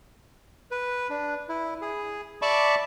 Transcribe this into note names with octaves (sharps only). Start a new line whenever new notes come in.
B4
D4
E4
G#4
D5 E5 A5 B5 C#6 D6